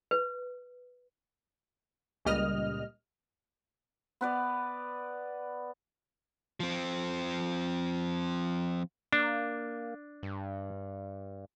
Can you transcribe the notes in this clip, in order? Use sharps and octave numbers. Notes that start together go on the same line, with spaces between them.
B4
C#2 A#2 G3 D#5 F6
B3 B4 D5
F3 C4
A#3 D4
G2